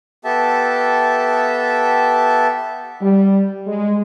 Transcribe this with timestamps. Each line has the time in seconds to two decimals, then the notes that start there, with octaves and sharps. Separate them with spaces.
0.25 B3 G4 A4 E5 A5
3.01 G3
3.67 G#3